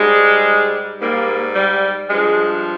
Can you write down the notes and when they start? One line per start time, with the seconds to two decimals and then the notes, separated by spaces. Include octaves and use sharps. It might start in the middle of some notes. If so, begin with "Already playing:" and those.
Already playing: G#2 G3 G#3
1.00 G#2 G3 A#3
1.54 G3
2.08 G2 F3 G#3